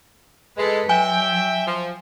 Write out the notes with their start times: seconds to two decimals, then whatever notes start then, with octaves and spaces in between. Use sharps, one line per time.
0.57 G#3 A4 B4
0.89 F#3 E5 G5 G#5
1.66 F3